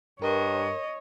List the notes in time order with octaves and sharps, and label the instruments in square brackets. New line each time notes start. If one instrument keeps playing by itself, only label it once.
[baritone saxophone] G2 [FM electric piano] A#4 [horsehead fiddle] C#5 [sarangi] D#5